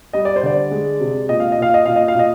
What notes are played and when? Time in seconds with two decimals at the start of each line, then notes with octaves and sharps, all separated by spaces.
0.13 G3 D#5
0.25 D5
0.36 C5
0.43 D3 D5
0.71 G#3
1.00 C3
1.29 A#2 D#5
1.40 F5
1.52 D#5
1.58 A#2 F5
1.74 D#5
1.86 A#2 F5
1.96 D#5
2.08 F5
2.15 A#2 D#5